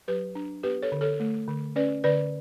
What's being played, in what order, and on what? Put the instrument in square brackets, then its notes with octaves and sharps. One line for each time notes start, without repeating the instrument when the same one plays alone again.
[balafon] F#3 G4 B4
D4
B3 G4 B4
A4 C#5
D3
A4 C#5
A3
D3
C#4 B4 D5
D3 B4 D5